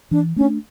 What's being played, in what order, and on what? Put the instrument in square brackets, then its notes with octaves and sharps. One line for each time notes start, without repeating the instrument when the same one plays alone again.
[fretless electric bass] E3 [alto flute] D4
[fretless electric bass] A3 [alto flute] C#4
[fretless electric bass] D4